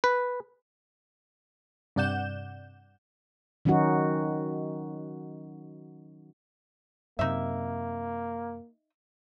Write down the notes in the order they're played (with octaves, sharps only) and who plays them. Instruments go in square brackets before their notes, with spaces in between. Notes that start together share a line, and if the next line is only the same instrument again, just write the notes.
[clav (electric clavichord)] B4
[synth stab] G2 C3 D5 F#5 G6 E7
[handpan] D#3 F#3 C#4 D#4 F#4
[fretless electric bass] F#2 C3 [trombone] A#3 [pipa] D#4 E5